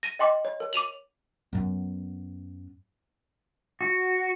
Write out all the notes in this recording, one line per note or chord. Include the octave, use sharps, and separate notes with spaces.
A#6 D#7
D#5 G5 C6 D6
C#5
A#4
D6 D#7 F7 F#7
F#2 B3
F#4